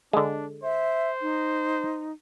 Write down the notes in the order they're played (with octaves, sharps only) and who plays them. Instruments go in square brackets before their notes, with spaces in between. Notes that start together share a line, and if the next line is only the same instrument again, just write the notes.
[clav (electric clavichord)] D3 G#3 [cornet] D4
[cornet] C5 [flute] E5
[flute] D#4